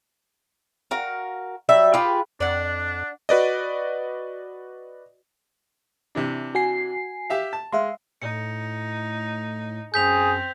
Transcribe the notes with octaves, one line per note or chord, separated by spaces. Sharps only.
F#4 A#4 F5
F#3 G3 E5
F4 G4 G#4 B4
F2 D4 D5 F#5
F#4 B4 D5 D#5
C3 E3 D4
F#4 G#5 C7
G4 E5 F5
A5
G#3 E5 F5 C6
A2 D#4 C#7
F#2 C4 G#4 G6 B6 F7